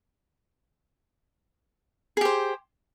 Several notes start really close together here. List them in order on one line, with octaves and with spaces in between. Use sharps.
G#4 G4 C5